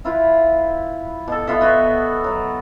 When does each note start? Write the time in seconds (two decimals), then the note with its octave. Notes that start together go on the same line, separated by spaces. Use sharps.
0.05 E4 F4 B4
1.28 B2 A4
1.47 B3 F4 A4 E5
1.61 B3 F#4
2.24 F#3